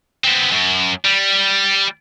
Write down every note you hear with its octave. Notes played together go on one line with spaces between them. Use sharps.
B3 C4
F#2
G3